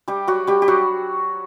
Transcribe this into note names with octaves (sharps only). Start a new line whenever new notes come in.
G3 G4
F#3 F#4
G3 G4
G4
F#3 F#4